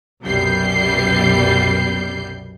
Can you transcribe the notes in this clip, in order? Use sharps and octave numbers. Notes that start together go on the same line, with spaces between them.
C2 F#2 B2 G3 G6 C7